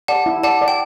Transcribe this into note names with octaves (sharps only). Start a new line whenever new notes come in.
D5 F#5 A5
E4
D5 F#5 A5
D5
G5